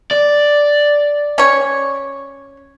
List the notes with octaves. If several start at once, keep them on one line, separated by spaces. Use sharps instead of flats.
D5
C#4 C#5